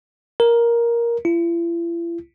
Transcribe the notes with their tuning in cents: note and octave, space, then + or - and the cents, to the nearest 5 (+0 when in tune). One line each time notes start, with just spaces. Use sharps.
A#4 +10
E4 +45